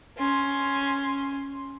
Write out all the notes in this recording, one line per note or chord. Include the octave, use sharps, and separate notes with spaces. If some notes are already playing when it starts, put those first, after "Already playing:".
C#4 C6